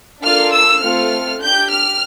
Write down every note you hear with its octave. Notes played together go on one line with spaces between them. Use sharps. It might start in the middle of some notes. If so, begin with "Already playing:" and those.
A#3 D4 F4 A4 F6
E6
A3 C4 F4 A4 F6
D4 G4 G6
F6